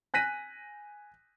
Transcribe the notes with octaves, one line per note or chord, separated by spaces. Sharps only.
G#5 F#6 A#6 B6 D#7